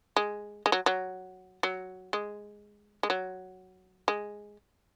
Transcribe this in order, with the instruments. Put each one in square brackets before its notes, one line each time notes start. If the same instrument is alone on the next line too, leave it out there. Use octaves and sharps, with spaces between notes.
[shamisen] G#3
G#3
F#3
F#3
F#3
G#3
G#3
F#3
G#3